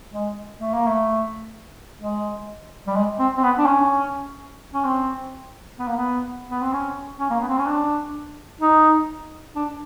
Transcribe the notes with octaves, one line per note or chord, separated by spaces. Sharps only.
G#3
A3
A#3
A3
G#3
G3
G#3
C4
C4
B3
D4
C#4
C#4
C4
B3
A#3
B3
B3
C4
C#4
C#4
A#3
B3
C4
C#4
D4
D#4
D4